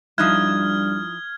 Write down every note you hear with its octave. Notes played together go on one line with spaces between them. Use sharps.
G2 F3 D#4 E4 D#6 F6 F#6 G#6